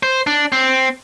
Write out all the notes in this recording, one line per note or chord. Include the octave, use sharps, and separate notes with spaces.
C5
D4
C4